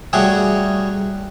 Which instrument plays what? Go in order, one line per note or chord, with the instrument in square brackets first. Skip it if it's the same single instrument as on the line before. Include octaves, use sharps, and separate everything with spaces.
[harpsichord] G3 A3 F#4 G#4 C#5 D5